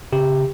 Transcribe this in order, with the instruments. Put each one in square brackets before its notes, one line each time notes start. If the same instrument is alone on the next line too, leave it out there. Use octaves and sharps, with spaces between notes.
[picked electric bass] C#3 [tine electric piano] G4